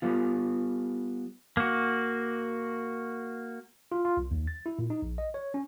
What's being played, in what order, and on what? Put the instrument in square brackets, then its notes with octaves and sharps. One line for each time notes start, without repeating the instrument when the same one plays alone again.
[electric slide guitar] G3 B3 F4
[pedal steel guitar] A#3 F#4
[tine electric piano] F4
F4
C2
D#2
A6
E4
A#2
D#4
A#1
D#5
C#5
C#4